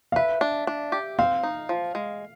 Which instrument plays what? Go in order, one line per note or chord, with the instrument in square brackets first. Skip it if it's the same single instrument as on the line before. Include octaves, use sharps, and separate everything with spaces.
[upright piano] F5
[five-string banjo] B4 [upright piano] E5
[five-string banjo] D4
D4
G4
[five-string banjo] C4 [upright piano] F5
[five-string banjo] D#4
F3
G#3